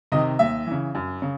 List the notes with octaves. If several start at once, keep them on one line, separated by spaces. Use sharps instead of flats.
C3 D#3 D#5
D#2 E5
C#3 E3
F#2
C#3